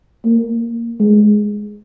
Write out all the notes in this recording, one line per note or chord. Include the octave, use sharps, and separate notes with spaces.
A#3
G#3